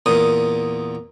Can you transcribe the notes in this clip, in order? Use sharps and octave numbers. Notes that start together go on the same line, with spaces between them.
E2 A#2 D#6